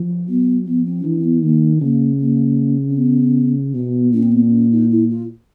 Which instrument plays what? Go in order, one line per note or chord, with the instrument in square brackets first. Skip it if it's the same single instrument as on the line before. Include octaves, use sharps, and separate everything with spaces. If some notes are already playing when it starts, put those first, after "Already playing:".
Already playing: [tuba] F3
[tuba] F#3 [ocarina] B3
[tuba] F3 [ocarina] B3
[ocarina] C4
C#4
[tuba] E3 [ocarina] D4
[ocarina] C4
B3
[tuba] D#3 [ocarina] A#3
[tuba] C#3 [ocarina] A#3
[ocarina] A#3
C4
B3
[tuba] B2 [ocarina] B3
[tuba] A#2 [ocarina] C#4
[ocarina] C4
B3
C4
C#4
D#4
E4
F4